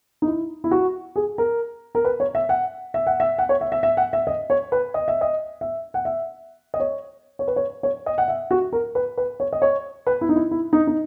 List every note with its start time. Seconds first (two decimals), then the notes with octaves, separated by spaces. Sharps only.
0.22 D#4
0.27 E4
0.64 E4
0.71 F#4
1.16 G#4
1.38 A#4
1.95 A#4
2.05 B4
2.20 C#5
2.35 E5
2.49 F#5
2.94 E5
3.07 F#5
3.20 E5
3.38 F#5
3.49 C#5
3.61 E5
3.72 E5
3.83 E5
3.97 F#5
4.13 E5
4.27 D#5
4.50 C#5
4.72 B4
4.94 D#5
5.08 E5
5.21 D#5
5.61 E5
5.94 F#5
6.05 E5
6.74 D#5
6.80 C#5
7.39 C#5
7.48 B4
7.56 C#5
7.83 C#5
8.06 D#5
8.18 F#5
8.28 E5
8.51 F#4
8.73 A#4
8.95 B4
9.18 B4
9.40 C#5
9.53 D#5
9.62 C#5
10.07 B4
10.21 E4
10.29 D#4
10.36 E4
10.51 E4
10.73 D#4
10.87 D#4